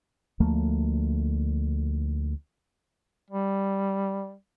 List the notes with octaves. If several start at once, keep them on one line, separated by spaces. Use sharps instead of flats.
D2 F3 A3 A#3
G3